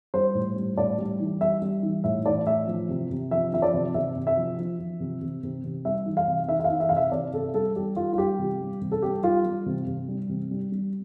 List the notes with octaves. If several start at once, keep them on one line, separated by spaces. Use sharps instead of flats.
G3 C5
A2
G3
A2 D5
G3
E3
G3 E5
G3
E3
A2 E5
E3 D5
A2 E5
F3
C3
C3
F3 E5
F3 E5
D5
C3
C3 E5
C3
E5
F3
F3
F3
C3
C3
C3
C3
G3 E5
E3
F5
C3
E3 E5
E5
F5
E3
E5
C3 F5
E5
C3 D5
C3 A4
G3 A4
G3 G4
G3 F4
F4
G3 G4
C3
G3
C3
A4
G3 G4
G3 F4
G3
C3
C3
G3
C3
G3
G3